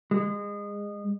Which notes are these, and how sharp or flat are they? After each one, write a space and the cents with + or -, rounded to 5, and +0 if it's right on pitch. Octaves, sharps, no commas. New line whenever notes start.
G#3 -25